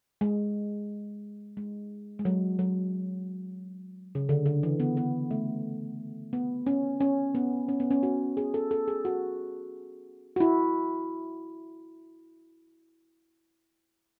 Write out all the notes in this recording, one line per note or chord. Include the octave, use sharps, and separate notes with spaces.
G#3
G#3
G#3
F#3
F#3
C#3
D3
D3
E3
B3
B3
A3
B3
C#4
C#4
B3
C#4
B3
C#4
F#4
G#4
A4
A4
G#4
F#4
F#4
E4